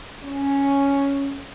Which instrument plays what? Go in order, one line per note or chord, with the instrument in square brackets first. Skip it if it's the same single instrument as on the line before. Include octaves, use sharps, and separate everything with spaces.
[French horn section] C#4